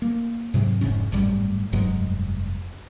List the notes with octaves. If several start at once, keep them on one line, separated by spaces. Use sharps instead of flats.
A#3
G#2 C3 F#3
F1 G#2 C#3 C#4
G#1 F#2 A2 G3
F1 G2 F#3 G#3